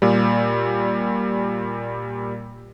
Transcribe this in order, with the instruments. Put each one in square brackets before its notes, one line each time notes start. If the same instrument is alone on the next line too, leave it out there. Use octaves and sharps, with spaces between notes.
[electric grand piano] A#2 G3